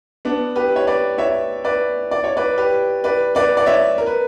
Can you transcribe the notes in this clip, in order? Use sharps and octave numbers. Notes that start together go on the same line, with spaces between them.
B3 D4
G4 B4
C#5
B4 D5
C#5 E5
B4 D5
D5
C#5
B4 D5
G4 B4
B4 D5
B4 D5
D5
C#5 E5
A#4
B4